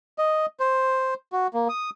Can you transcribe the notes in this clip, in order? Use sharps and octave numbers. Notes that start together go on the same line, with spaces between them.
D#5
C5
F#4
A#3
D#6